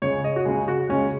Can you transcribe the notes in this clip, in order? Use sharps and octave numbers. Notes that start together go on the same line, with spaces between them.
C#2 C#3 G#3 C#5
D#5
F#4
C#2 C#3 G#3 G#4
F#4
C#2 C#3 G#3 C#4